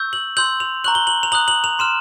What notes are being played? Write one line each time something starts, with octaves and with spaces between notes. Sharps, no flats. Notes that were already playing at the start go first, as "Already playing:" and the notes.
Already playing: C#6 E6 G6
F#7
C6 E6 G6 F#7
F7
A#5 C#6 F#6 F#7
G7
F#7
F7
A#5 D#6 F#6 F#7
F#7
F7
C6 F6 E7